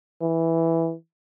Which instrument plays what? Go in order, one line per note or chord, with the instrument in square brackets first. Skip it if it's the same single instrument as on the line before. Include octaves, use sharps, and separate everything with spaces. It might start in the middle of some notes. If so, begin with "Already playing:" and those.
[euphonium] E3